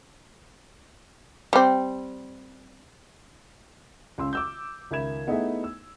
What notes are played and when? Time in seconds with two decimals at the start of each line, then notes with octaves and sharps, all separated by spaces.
1.53 G3 C4
4.18 C#2 C#3 C6 E6
4.33 D6 E6 G6
4.91 C#2 D#3 E5 B5 G#6 E7
5.27 A3 B3 D#4 E4 G#4 E5
5.64 E6